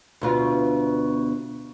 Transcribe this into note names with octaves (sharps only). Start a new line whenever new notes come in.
D2 B2 F4